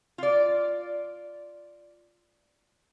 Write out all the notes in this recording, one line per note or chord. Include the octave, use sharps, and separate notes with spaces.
F4 D5